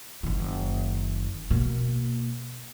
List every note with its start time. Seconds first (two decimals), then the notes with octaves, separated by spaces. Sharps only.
0.23 F#1 D#3
1.51 B2 A#3